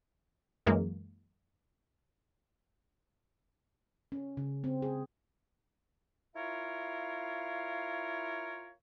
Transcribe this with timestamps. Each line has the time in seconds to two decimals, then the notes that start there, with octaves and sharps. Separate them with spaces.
0.67 F#2 E3 G#3 A#3
4.12 C#4
4.37 C#3
4.64 C4
4.82 G#4
6.36 E4 F4 A#4 C#5 F5